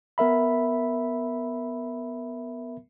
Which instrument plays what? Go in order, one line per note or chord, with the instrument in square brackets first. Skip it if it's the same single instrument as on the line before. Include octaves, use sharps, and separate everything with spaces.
[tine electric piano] B3 A#4 E5 B5